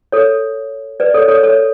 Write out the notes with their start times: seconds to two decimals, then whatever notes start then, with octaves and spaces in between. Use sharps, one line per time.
0.12 A4 C#5
1.00 B4 D5
1.14 A4 C#5
1.28 A4 C#5
1.43 A4 C#5